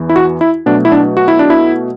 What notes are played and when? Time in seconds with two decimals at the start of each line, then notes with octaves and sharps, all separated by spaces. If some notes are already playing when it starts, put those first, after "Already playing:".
Already playing: E2 E3
0.09 E4
0.16 F#4
0.41 E4
0.66 B2 F#3 A3 D4
0.85 E4
0.92 D4
1.17 F#4
1.28 E4
1.39 D4
1.50 E4